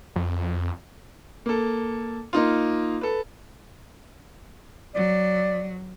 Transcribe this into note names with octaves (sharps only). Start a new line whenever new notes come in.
F2
A#3 A4
A#3 D#4 F4
A4 B4
F#3 D5